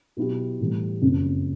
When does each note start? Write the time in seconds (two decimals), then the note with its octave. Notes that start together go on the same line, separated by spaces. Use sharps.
0.17 B2 F#3 B3 E4 G4
0.60 A2 E3 G3
1.01 F#1 F2 C#3